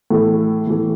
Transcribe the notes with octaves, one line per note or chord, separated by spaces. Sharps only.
A2 E3 A3
A2 E3 A3